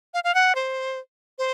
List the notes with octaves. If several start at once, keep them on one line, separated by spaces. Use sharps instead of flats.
F5
F5
F#5
C5
C5